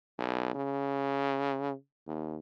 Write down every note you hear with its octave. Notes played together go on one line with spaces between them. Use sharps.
B1
C#3
D#2